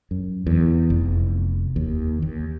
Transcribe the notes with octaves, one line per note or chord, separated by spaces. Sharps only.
F#2
E2
F1
D#2
D#2